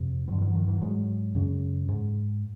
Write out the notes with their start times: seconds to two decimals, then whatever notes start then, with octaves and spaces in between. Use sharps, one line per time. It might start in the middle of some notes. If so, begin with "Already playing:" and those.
Already playing: F2 C3
0.28 G2 D3 E3 F#3
0.41 E3 F#3
0.55 D#3 F3
0.68 E3 F#3
0.81 G#2 F#3 G#3
1.35 F#2 C#3
1.89 G#2